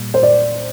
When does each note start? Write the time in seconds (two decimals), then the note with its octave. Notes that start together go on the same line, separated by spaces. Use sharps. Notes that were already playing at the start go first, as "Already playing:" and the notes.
Already playing: A#2 G3
0.14 C5
0.23 D5